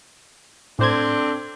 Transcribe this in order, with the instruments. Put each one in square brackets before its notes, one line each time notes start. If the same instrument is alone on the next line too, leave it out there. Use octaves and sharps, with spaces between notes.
[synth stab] A2 C5 G#6 [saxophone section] C4 D4 A4